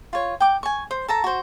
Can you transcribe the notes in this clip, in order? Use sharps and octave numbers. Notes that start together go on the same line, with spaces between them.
F4 C#5
G5 D6
G#5 C#6
C5
A4 A5 A#5
F#4 C5